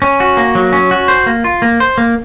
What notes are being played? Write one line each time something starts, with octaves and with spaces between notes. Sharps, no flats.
C#4
F#4
A#3
F#3
C#4
F#4
C5
A#3
F4
A#3
C5
A#3